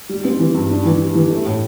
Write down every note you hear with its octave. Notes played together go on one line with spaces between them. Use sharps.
G3
C4
E3
G2
D4
E3
G3
E3
A3
A2